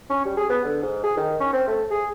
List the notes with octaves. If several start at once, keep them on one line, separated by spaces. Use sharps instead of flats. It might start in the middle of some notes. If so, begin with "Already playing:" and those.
C#4
G3
G#4
B3
D3
G#2
G#4
D#3
C#4
C4
A3
G#4